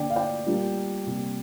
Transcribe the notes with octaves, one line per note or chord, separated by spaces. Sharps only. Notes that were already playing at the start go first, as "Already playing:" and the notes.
Already playing: D3 A#3 D4 D5 G5
F5
D5 G5
A#2 G3 A#3 D4
C3 G3 A#3